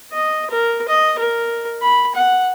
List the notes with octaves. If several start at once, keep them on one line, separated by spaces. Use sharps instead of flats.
D#5
A#4
D#5
A#4
B5
F#5